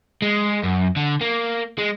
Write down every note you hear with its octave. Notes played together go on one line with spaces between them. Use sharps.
G#3
F#2
D3
A#3
G#3